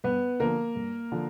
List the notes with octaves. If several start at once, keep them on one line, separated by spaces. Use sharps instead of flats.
G2 B3 B4
D3 F3 A#3 A#4
G2
D3 F3